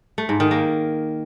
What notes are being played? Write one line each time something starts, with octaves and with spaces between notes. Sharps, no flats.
A3
G#2
D#3
A#3